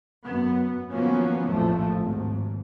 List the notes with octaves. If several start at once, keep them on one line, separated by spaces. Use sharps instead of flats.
F#2 B3
D#3 F3 F#3 A#3 B3 C#4
A#1 F2 A2 F3 A3
G#1 D#2 G#2